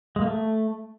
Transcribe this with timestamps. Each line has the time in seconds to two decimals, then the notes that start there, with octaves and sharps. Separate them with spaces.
0.16 G#3
0.21 A#3
0.27 A3